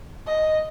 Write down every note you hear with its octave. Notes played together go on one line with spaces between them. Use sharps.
D#5